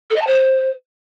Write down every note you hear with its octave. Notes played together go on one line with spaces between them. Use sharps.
A4
D#5
A5
C5